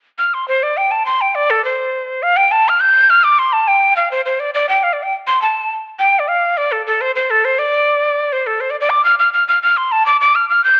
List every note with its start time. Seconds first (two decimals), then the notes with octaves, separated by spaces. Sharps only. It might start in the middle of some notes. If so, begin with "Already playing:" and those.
0.18 F6
0.34 C6
0.48 C5
0.63 D5
0.77 G5
0.91 A5
1.06 C6
1.21 G5
1.35 D5
1.50 A4
1.65 C5
2.23 F5
2.37 G5
2.51 A5
2.69 F6
2.80 G6
3.10 F6
3.24 D6
3.39 C6
3.53 A5
3.68 G5
3.96 F5
4.11 C5
4.25 C5
4.40 D5
4.54 D5
4.69 G5
4.83 F5
4.93 D5
5.03 G5
5.27 C6
5.42 A5
5.99 G5
6.19 D5
6.28 F5
6.57 D5
6.72 A4
6.87 A4
7.01 C5
7.16 C5
7.30 A4
7.45 C5
7.59 D5
8.33 C5
8.47 A4
8.60 C5
8.70 D5
8.81 D5
8.90 D6
9.04 F6
9.19 F6
9.34 F6
9.48 F6
9.63 F6
9.77 C6
9.92 A5
10.06 D6
10.21 D6
10.35 F6
10.49 F6
10.64 G6